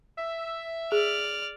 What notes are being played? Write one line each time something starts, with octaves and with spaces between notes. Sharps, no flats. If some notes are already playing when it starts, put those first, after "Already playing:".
E5
G#4 D5 F6